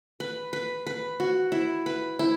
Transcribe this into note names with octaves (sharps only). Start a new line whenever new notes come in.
B4
B4
B4
F#4
E4
B4
E4